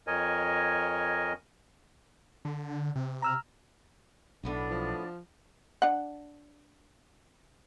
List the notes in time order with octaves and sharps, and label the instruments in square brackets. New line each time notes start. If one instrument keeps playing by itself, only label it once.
[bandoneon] F2 A#4 C#5 D#5 G#5
[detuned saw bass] D3
C3
[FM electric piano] A#5 E6 F6
[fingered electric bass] B1 [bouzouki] A2 B3 F#4 [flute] D4
[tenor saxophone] F3
[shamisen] D4 F#5